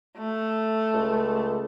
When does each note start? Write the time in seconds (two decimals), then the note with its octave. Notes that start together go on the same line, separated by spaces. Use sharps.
0.18 A3
0.94 C#2